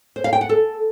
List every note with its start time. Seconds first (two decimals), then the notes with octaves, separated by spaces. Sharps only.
0.16 C5
0.24 F5
0.33 G5
0.41 F#5
0.49 A4